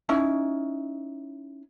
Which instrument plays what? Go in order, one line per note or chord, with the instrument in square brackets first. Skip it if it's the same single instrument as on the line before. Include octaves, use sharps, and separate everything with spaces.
[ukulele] C#4 D#4 E4